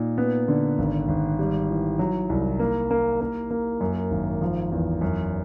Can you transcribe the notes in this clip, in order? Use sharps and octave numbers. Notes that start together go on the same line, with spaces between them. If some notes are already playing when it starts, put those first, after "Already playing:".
Already playing: A#2 D#4
B3
D3
G#1
G#1
G3
E3
F#3
C2
A#3
A#3
A#3
A#3
F#2
G#1
F3
E2
F#2